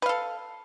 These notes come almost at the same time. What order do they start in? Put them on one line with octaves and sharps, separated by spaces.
B4 F5 A4